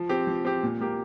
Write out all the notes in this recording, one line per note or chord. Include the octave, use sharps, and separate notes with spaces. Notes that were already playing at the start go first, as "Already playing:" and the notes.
Already playing: F3
C4 G4
F3
C4 G4
A#2
A#3 G4